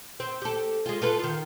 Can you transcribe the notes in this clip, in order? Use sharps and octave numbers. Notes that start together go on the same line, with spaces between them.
C4
G4 A4
G#3 F4
F4 A4 B4
D#3 F4